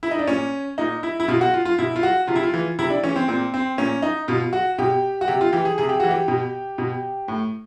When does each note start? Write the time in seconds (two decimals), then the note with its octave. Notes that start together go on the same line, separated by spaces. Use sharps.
0.03 E4
0.11 D#4
0.19 D4
0.27 A#2 C#4
0.78 A#2 D#4
1.03 E4
1.20 E4
1.28 B2 F4
1.41 F#4
1.54 F4
1.65 F4
1.79 B2 E4
1.96 F4
2.03 F#4
2.27 C3 F4
2.36 E4
2.43 F4
2.54 E3
2.79 C3 E4
2.90 D4
3.04 E3 C#4
3.16 C4
3.28 A#2 C4
3.54 C4
3.78 A#2 C#4
4.02 D#4
4.28 B2 F4
4.53 F#4
4.78 B2 G4
5.21 F#4
5.28 C3 G4
5.41 F4
5.53 E3 G4
5.65 G#4
5.78 C3 G#4
5.89 G4
6.00 E3 F#4
6.11 G4
6.28 B2
6.78 B2
7.28 A2